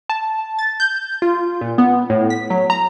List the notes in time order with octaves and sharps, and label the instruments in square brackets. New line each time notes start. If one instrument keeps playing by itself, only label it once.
[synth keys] A5
A6
G6
F4
A#2
B3
A2
B6
F#3
A#5